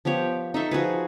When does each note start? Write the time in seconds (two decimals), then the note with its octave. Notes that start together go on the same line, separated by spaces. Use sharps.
0.05 F3 B3 G4 C#5
0.54 D#4 A4 E5 C#6
0.71 F3 F#4 G#4 B4